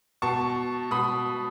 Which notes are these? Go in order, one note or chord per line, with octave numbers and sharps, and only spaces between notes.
B2 A5 C#6
B2 B5 D#6